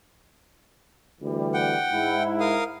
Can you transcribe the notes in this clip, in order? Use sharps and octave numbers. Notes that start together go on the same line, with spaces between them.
D2 E3 G3
F#5 G5
G#2 E4
A#4 F5 D#6